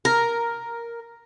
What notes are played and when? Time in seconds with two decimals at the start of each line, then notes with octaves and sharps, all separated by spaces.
0.05 A#4